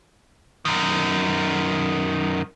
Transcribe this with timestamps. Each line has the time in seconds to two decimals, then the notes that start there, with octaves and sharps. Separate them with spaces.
0.65 F#2 D#3